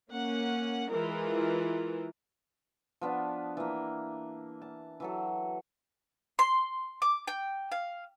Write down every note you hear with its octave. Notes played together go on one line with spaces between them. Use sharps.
A#3 C#4 F#5
E3 G#3 F4 A#4
F3 B3 D4
E3 A#3
A5
E3 F#3 A4
C6
D6
G5
F5